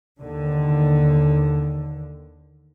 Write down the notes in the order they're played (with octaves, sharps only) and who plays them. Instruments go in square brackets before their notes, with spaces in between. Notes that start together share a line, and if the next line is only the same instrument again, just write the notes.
[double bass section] D#2 D3